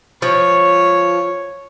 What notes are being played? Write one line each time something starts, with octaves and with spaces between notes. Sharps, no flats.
F3 C#5